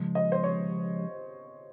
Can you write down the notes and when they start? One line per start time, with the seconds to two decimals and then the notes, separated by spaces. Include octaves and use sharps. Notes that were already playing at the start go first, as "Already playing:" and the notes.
Already playing: C#3 F3 G#3
0.15 D#5
0.32 C5
0.44 C#5